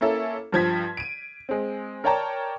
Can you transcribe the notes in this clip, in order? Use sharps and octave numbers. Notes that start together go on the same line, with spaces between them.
A#3 C#4 E4 A4
G2 F3 G#6 B6
D7 D#7
G#3 C4
A#4 C#5 D5 G5 A5 A#5